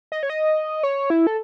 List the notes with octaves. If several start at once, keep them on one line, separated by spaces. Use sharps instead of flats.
D#5
C#5
D#5
C#5
E4
A4